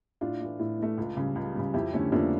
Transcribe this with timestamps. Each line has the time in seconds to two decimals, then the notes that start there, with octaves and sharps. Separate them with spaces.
0.21 A2 D4 F4
0.40 E3 A3
0.59 A2
0.79 E3 A3
0.98 C#2
1.17 C#3 G3
1.35 C#2
1.55 C#3 G3
1.74 F2 E4 G4
1.94 D3 A3 C#4 E4
2.12 F2 A#3 D4